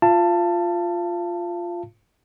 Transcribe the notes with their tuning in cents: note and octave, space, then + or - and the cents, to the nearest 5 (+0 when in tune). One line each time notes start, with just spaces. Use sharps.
F4 +0 F5 -35 A5 +15